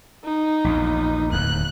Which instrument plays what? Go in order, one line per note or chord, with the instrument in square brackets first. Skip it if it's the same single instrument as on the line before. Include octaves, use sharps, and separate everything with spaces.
[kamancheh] D#4
[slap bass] A#1 E2
[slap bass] D1 D#2 [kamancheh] F#6